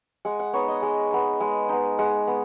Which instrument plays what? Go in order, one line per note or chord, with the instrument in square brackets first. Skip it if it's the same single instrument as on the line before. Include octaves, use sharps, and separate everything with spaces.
[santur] G#3 F#5
F#5
B3 D#4 C#5
D#5
G#3
B3 D#4
G#3
B3 D#4
G#3 F#5
B3